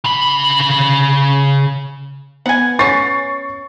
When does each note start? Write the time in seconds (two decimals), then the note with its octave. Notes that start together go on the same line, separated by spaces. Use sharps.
0.04 C#3 B5
2.46 B3 F#5 G#5
2.79 B3 C#4 C#6 A6 C7